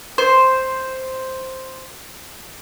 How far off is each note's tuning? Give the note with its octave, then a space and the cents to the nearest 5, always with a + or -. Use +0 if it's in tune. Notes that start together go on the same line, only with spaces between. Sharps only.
C5 +0